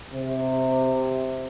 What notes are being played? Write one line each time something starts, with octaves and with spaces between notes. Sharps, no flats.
C3